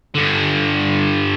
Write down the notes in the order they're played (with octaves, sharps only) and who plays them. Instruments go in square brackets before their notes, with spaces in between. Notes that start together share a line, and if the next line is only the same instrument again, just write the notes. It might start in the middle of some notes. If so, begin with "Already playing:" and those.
[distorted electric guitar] G2 D3